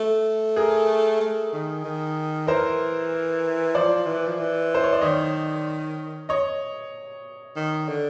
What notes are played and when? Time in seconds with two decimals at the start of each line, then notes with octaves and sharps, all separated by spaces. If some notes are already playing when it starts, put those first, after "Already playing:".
Already playing: A3
0.56 G#4 A#4
1.21 A3
1.52 D#3
1.84 D#3
2.47 E3 A#4 C5
3.75 F3 C5 D5
4.06 E3
4.27 F3
4.39 E3
4.75 C5
4.84 C#5
4.93 D5
5.01 D#3 C#5 D#5
6.29 C#5 D#5
7.56 D#3
7.88 D3